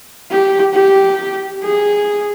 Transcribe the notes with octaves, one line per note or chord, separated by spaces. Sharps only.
G4
G4
G#4